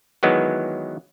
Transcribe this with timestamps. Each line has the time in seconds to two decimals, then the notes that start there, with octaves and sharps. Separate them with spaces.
0.23 D#3 E3 F#3 G#3 B3